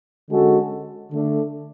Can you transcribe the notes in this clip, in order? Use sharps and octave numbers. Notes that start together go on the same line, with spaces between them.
D3 G#3 C#4 F#4 A4
D3 A3 D4 A4